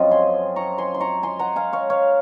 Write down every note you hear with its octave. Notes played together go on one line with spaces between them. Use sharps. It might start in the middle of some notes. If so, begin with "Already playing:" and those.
Already playing: F#2 F3 C4 F4 D#5 F#5
G#5 C6
A#5 C#6
G#5 C6
C6
A#5 C#6
G#5 C6
F#5 A#5
F5 G#5
C#5 F5
C#5 F5